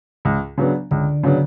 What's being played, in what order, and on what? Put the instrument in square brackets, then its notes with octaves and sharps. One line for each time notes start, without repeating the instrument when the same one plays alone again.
[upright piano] C#2
C#3 F#3 B3 D4
[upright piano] C#2 [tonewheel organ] D3
[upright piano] C#3 F#3 B3 D4